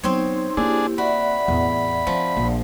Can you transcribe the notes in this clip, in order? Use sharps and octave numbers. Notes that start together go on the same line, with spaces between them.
F#3 B3 C4 D#4 C5 C#5
A#3 D4 E4 G4 G#4
F#4 D5 E5 F#5 B5
E2 A2
F3 C4
A#1